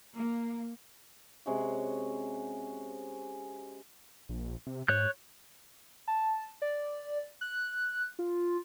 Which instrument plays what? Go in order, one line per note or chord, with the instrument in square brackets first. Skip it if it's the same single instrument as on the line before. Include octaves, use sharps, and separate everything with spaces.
[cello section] A#3
[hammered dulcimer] C3 G#3 C#4 F#4
[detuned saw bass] A#1
C3
[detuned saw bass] G#2 [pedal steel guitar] C#5 F#6 G6
[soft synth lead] A5
D5
F#6
F4